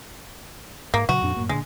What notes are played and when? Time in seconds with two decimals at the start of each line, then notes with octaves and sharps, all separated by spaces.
0.94 G#2 A#3
1.09 A#2 C#3 F#3 F#4
1.22 F2 A#2 D4
1.36 F#2 A2 A#3
1.49 A#2 D3 G#3